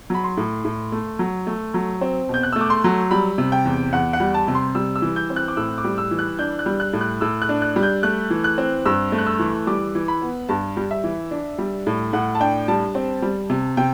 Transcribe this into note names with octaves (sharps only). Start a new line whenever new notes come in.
F#3 B5
C6
A2
A2
A3
F#3
A3
F#3
C4
B2 G6
F#6
A3 E6
D6
C6
F#3
G3 B5
C3
G5
E2
E2 F#5
F#5
G3
A5
C3
C6
G3 E6
E6
E3
G6
C4
F#6
D6
A2 E6
D6
G3
E6
E3
F#6
D4 G6
F#6
G3
F#6
A2
F#6
A2 E6
F#6
D4
F#6
G3
G6
A3 F#6
E3
F#6
C4
G2 E6
A3
F#6
E6
E3
G3 D6
E3
B5
B3
G2 A5
G3
E5
E3
D4
G3
A2
A2 F#5
A5
D4 G5
G3 A5
C4
G3
C3
C3 G5